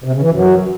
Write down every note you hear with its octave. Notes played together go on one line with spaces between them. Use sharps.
C3
C#3
E3
F#2